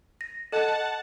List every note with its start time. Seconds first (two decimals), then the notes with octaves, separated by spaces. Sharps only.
0.21 A#6
0.52 A4 D#5 F#5 A5